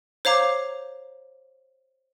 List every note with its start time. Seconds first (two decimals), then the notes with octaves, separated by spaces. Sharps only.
0.25 C5 C#5 F5 A#5 D6